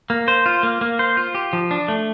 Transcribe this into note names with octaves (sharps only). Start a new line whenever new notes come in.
A#3
C5
F4
A#3
A#3
C5
F4
G4
F3
D4
A3